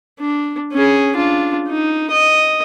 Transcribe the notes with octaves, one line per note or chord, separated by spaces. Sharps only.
D4
C#4 G#4
D4 F4
D#4
D#5